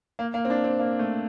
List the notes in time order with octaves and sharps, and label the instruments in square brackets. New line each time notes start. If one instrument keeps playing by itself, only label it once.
[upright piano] A#3
A#3
C4
D4
C4
A#3
A3